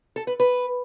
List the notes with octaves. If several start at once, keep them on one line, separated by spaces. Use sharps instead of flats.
A4
B4
B4